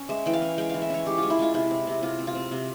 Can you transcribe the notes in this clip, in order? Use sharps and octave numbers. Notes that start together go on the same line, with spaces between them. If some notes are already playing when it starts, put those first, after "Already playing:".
Already playing: C#4
G#3 E5
E3 G5
F5
C#4
G#3 G5
E3 F5
E5
C#4 C#5
G#3 G4
G#3 F4
E4
G#3 F4
C3 E4
C4
C3
C3 F4
C4
F4
C4
C3